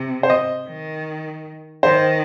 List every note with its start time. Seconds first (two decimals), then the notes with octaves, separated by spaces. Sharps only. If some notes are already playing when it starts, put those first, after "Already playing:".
Already playing: C3
0.23 C5
0.30 D#5
0.68 D#3
1.83 D#3 C5